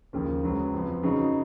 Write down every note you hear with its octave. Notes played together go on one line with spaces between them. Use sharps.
D#2 C#3 F3 A#3
C#2 C#3 F#3 B3
F2 F3 B3
C#3 F#3 B3 D#4 F#4